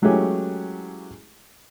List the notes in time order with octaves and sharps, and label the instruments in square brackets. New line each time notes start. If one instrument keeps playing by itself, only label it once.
[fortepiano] E3 F#3 G#3 A3 C#4 G4